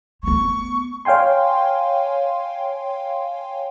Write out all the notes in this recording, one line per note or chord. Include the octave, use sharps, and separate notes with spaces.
A3 B3 C#6
C#5 F5 G5 G#5 C6